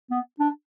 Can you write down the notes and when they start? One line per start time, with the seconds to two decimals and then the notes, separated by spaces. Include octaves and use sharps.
0.11 B3
0.40 D4